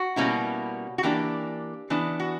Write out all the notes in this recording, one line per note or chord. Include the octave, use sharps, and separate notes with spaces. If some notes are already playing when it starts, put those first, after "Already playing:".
Already playing: F#4
B2 G3 A#3 C#4 E4
F#4
E3 A#3 D4 G4
E3 B3 D4
F#4